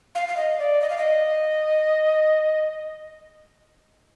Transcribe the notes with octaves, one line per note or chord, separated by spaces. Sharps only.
F5
F5
D#5
D5
D#5
F5
D#5